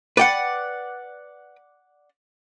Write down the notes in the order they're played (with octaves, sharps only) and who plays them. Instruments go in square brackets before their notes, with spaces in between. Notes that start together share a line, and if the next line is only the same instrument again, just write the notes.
[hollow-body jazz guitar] B4 G5 [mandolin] D5 F#5